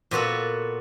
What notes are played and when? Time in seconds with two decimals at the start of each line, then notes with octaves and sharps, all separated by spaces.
0.11 A#2 B3 F#4 A4